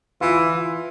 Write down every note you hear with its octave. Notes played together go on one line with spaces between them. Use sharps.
E3 F4